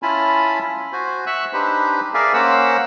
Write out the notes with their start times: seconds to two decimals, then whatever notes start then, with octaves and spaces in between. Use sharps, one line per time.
0.03 C#4 E4 F4 G#5 A5 B5
0.93 F#4 C5 G#5
1.27 E5 C#6 E6 F#6
1.53 D4 D#4 G4 B4 C5
2.14 G#4 A#4 D5 E5 F5 G#5
2.34 A#3 C#4 A#4 C5 F#5 E6